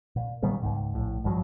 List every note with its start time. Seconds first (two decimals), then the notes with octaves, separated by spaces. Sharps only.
0.16 A#2
0.43 A#2 D#3 G3 B3
0.62 C#2 G#2
0.94 A#1 A2
1.24 G#1 G2 F3 F#3